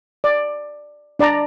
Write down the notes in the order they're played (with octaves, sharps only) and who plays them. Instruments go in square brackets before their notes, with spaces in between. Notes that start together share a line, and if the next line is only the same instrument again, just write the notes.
[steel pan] D5
D4 D5 A5 A#5